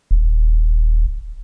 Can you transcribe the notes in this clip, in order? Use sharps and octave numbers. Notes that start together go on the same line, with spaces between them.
D#1